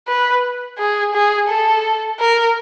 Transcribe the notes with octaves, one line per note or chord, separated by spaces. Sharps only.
B4
G#4
G#4
A4
A#4